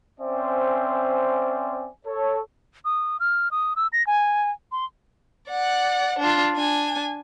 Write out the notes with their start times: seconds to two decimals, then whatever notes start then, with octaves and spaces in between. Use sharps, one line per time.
0.21 C4 C#4 C5 D5 E5 G#5
2.07 A4 C#5
2.85 D#6
3.20 F6
3.51 D#6
3.76 E6
3.93 A#6
4.07 G#5
4.72 C6
5.48 D5 F#5
6.19 D4 F4
6.55 D4 G#5